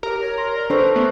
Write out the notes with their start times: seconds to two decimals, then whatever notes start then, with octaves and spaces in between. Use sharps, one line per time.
0.03 G4 A#4
0.21 C#5
0.38 C6
0.55 D5
0.70 D4 A4 B4 C5 C#6
0.96 A3 B3